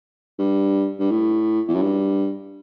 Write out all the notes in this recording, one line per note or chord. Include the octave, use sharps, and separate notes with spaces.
G2
G2
A2
E2
F#2
G2